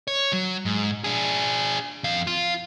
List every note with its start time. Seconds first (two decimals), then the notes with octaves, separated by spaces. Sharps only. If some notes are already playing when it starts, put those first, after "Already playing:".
0.08 C#5
0.33 F#3
0.65 G#2
1.04 D4 G#4
2.04 F2 F5
2.27 F4